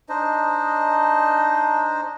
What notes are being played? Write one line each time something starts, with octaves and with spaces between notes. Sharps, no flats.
D4 D#4 C5 D#5